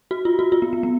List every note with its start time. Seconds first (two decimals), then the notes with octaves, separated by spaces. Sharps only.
0.11 F#4
0.25 F4
0.39 F#4
0.52 F4
0.62 B3
0.73 B3
0.83 B3